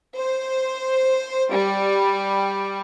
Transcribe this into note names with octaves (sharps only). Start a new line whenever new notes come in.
C5
G3